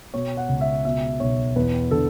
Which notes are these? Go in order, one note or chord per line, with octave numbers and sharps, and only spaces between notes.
B2 C#5
F#5
C#2
E5
B2 E5
B1 C#5
E2 B4
D3 A4